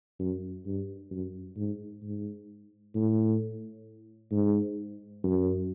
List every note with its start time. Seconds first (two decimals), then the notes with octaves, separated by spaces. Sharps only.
0.20 F#2
0.66 G2
1.11 F#2
1.56 G#2
2.03 G#2
2.95 A2
4.31 G#2
5.24 F#2